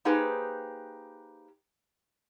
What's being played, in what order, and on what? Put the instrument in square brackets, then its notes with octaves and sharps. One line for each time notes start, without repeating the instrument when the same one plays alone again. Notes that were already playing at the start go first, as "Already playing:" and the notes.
[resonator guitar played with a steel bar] A#3 D#4 G4 G#4 B4 C5